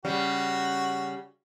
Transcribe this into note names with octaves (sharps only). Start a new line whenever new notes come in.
C#3 G3 F#4